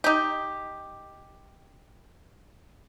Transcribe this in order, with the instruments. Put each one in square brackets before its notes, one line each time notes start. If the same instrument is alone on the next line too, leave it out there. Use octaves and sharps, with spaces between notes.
[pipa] D#4 G4